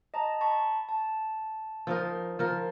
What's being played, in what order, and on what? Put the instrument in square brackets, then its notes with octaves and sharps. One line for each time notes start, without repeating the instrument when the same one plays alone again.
[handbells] D#5 A5 A#5
A5 B5 C#6
A5
[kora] F3 D#4 A#4
F3 A#4